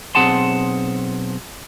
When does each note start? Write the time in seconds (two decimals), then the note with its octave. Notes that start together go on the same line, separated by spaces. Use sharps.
0.15 B1 C4 G#4 F#5 A5 C6